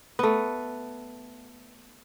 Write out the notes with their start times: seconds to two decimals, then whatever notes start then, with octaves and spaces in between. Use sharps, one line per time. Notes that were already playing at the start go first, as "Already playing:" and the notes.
0.19 A3 B3